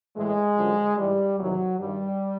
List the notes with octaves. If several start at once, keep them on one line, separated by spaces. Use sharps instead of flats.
A2 E3 G#3
F#2 D3 F3
G#2 E3 G3
E2 C3 D#3 F#3
G2 D#3 G3